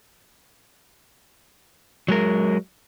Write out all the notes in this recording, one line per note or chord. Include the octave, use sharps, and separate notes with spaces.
F#3 G#3 A#4